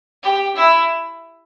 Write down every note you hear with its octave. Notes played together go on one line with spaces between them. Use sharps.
G4
E4